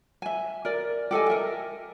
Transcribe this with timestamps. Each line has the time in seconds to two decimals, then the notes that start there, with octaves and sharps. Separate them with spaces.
0.22 E5 G#5
0.65 A#4 D5
1.11 G4 A4 D#5 G#5
1.29 A#4 E5